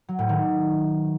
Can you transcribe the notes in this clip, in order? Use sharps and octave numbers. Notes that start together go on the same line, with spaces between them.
F#3
A2
D#3